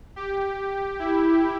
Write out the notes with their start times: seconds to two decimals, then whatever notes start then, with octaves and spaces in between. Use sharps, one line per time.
0.16 G4
0.99 E4